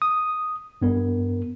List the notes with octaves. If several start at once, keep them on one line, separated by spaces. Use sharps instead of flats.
D#6
G2 B3 A#4